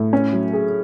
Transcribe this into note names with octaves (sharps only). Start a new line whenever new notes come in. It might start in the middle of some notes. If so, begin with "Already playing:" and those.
Already playing: A2
C#4
F#3
G#4